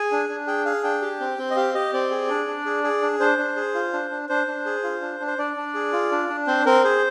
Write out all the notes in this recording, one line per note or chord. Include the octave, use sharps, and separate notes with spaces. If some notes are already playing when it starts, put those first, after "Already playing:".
Already playing: G#4 G#5
D4
D4
G#4 G5
G#4 F5
D4 G5
G4
C4
C4
D#5
G4 F5
G4 D#5
C4 D5
G#4
D4
D4
G#4
G#4
D4
D4 C5
D4
G#4
F4
D4
D4
D4 C5
D4
G#4
F4
D4
D4
C5
D4 D5
D4
G#4
F4
D4
D4
C4 C5
C4 A#4
G#4 C5